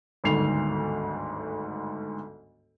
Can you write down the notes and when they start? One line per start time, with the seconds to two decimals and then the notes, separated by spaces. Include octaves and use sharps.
0.24 G1 D2 G#2 D#3 C7 F7